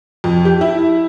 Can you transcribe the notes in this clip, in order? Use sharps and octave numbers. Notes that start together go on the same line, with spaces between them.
F2
G4
E4